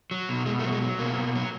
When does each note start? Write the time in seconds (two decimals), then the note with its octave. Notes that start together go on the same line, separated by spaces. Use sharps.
0.11 F#3
0.29 B2
0.46 B2 G#3
0.59 A3
0.63 F#3
0.72 G#3
0.82 F#3
0.99 B2 A#3
1.17 B2
1.35 F#3